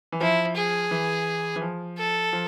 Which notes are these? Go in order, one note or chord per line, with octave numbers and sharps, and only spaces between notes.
E3
F3 E4
G#4
E3
E3
F3
A4
F3